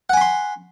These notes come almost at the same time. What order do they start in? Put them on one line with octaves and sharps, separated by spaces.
F#5 G#5 B5 C6